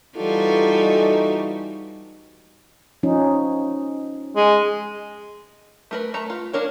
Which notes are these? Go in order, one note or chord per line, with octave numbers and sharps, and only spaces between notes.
E3 G3 D#4 F4 F#4 A4
F3 C#4 D#4
G#3
A3 A#4 B4
A3 A#5
F4
A#3 D4 A#4 C#5